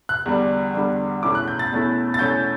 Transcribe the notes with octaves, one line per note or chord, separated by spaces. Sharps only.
F#6
E2 D3 G3 D4
E2 D3 G3 D4
E2 B2 A3 C#4 E4 D6
F#6
G6
A6
E2 B2 A3 C#4 E4
A6
E2 B2 A3 C#4 E4 G6